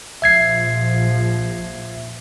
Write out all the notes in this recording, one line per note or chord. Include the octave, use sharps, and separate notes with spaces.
A#1 F3 E5 G#6 C7